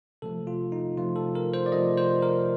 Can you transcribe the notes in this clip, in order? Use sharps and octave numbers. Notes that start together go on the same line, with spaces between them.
C3 F3 A3 A4
F4
D#4
C3 F3 A3 F4
A4
A#4
C5
D5
C3 F3 A3 D#5
C5
A#4